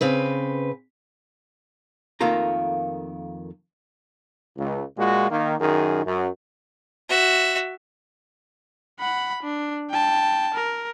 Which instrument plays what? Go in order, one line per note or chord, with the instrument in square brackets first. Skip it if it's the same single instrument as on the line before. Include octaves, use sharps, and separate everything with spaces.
[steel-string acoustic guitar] C#3 C4 B4
[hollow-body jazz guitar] F2 D#3 A3 A#3 F4 A#5
[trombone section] C#2
A#2 G#3 F4 F#4
D#3 A#3
F#2 D#3 G#4 A#4
F#2
[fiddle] F#4 E5
[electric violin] F#5 B5
D4
G5 A5
A#4